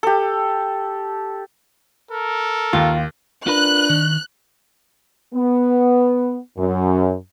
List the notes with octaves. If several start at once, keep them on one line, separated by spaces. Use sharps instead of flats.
G4 A4
A4 A#4
D#2 F4
D4 F4 A#4 B4 F#6
D#3
B3
F#2